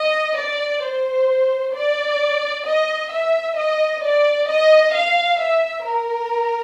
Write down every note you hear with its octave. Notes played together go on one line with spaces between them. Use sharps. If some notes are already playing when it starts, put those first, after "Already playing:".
Already playing: D#5
D5
C5
D5
D#5
E5
D#5
D5
D#5
F5
E5
A#4